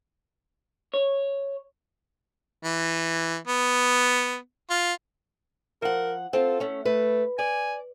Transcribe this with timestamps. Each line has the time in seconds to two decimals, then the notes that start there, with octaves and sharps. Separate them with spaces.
0.94 C#5
2.63 E3
3.47 B3
4.70 F4
5.82 F3 A#4 F#5
6.33 C4 F4 A4
6.60 A3 C#4
6.85 A3 B4
7.39 D5 G#5